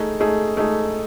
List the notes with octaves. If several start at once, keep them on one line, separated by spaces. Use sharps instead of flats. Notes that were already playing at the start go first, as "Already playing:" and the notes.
Already playing: A3 D#4 G#4
A3 D#4 G#4
A3 D#4 G#4